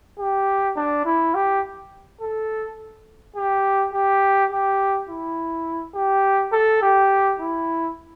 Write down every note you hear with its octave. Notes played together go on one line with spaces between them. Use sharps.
G4
D4
E4
G4
A4
G4
G4
G4
E4
G4
A4
G4
E4